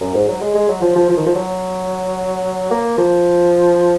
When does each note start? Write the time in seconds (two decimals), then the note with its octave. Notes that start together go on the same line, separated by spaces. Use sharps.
0.01 F#2
0.14 G#2
0.28 F#3
0.41 G#3
0.55 G#3
0.69 F#3
0.82 F3
0.96 F3
1.09 F3
1.17 D#3
1.26 F3
1.35 F#3
2.71 A#3
2.98 F3